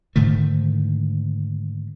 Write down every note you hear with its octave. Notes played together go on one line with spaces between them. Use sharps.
G#2 D3 D#3 A3